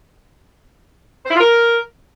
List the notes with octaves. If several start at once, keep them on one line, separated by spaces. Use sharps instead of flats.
C5
E4
F4
A#4